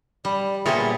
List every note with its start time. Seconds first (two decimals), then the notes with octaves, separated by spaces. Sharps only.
0.25 G3 D5
0.66 A#2 G3 B3 G#4 C#5 E5